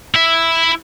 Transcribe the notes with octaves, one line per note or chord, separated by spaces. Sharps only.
E4 E5